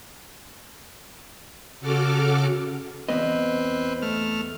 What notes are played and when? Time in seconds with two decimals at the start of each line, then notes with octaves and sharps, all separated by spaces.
1.80 C#3 F#4 A4 D6 F6
3.09 E2 B3 C4 B4 D#5
4.02 A3 F6